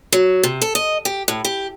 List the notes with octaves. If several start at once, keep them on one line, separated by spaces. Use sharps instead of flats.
F#3
C3
A4
D#5
G4
A2
G4